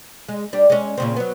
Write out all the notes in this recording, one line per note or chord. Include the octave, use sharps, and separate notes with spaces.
G#3
G3 D4
G#3 C#4
A#2 C#3 C4
F#3 B3